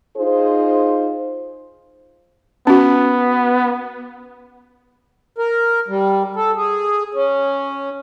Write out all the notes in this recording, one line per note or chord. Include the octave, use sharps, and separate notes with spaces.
D#4 F4 G#4 C5
B3 C#4 F#4
A#4
G3
A4
G#4
C#4